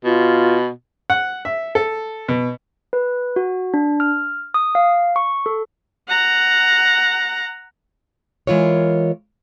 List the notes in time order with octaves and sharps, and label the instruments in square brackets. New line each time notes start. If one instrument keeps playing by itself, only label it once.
[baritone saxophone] B2 [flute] F4
[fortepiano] F#5
E5
A4
B2
[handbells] B4
F#4
D4
F6
D#6
F5
C#6
A4
[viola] F#5 A#5
[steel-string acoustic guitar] E3 G#3 F4 A#4 C#5